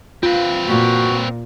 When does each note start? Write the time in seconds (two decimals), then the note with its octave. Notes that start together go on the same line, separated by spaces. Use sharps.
0.23 C4 F4 B4
0.69 A#2 F#4